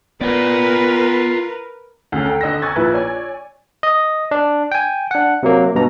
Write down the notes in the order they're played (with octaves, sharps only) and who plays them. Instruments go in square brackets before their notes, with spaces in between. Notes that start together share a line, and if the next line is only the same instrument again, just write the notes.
[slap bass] B3 [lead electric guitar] F4 D5 [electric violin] A#4 B4
[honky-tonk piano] D2 C#3
A4 G5 A#5
D3 D#5 E6 A#6
G#5 A#5 C#6 F#6 G#6 A6
A#1 A#2 E4 B4
C#5 D5 G#5
[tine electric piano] D#5
D4
G5 G#5
D4 F#5
C3 F#3 A#3
G2 B2 A#5